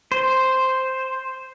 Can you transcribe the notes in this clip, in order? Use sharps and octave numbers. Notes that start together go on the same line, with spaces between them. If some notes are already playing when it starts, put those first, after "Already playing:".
C5